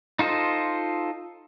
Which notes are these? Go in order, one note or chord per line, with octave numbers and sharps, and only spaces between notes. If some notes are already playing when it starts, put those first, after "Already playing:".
D#4 F4 A4 C5 D#5